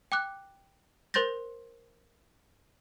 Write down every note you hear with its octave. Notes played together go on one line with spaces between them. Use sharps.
G5 D6 F#6
A#4 C5 C6 G6 A6 A#6